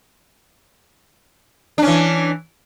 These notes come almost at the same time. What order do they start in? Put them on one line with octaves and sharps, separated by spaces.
D4 C#4 E3